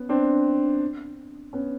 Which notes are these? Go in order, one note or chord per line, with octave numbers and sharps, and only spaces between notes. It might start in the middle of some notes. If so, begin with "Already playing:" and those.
Already playing: B3 C#4
C4 D4
B3 C#4